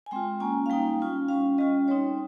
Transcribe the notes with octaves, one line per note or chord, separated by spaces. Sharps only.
G#5
G#3 C4 F4 G5
A#3 C#4 F4 G#5
F5
G3 A#3 D#4 G5
G3 C#4 F4
G3 C#4 F4 F5
G3 C#4 F4 D#5
G3 C4 D#4 C#5